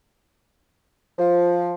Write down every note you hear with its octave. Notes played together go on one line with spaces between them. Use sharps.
F3